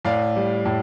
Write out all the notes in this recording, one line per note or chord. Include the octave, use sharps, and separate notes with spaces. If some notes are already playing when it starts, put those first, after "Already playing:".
A2 D5 F5
G3
A2